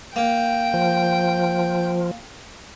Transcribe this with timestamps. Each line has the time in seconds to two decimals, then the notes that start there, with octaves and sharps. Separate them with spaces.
0.16 A#3 G5
0.74 F3